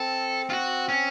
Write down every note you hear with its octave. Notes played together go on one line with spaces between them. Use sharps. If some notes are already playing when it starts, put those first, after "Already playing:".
Already playing: C4 A4
F4
F#4
C#4